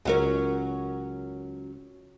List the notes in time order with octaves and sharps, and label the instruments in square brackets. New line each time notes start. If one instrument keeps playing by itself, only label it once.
[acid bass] C#2 [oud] F#3 C#4 A#4